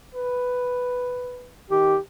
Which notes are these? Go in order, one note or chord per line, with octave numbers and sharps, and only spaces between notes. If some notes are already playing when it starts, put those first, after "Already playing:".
B4
D#3 G4